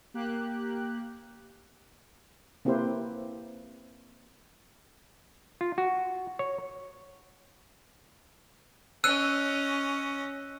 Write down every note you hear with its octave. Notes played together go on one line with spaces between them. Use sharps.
A#3 G4 F#6
A#3 C4 E4 G4 B4 C5
F4
F#4
C#5
C#4 D#5 E6 F#6 D#7